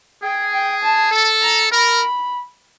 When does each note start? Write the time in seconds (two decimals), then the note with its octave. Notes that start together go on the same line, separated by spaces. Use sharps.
0.23 G#4 G5
0.53 G5
0.83 A5
1.12 A4
1.42 A#5
1.72 A#4 B5